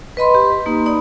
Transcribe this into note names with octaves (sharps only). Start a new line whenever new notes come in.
B4 D#5 B5 C6
G4
A#3 D#4
D#4 D5 B5